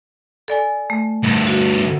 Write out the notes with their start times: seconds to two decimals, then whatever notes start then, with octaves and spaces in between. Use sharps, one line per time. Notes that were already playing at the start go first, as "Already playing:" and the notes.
0.48 A4 D5 G#5
0.90 A3
1.23 D2 G2
1.47 F#4